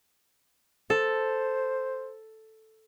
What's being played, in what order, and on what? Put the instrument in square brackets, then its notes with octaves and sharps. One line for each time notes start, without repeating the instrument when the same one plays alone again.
[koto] A4 [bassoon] C5